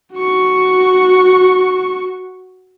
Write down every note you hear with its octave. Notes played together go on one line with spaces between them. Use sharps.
F#4 C#6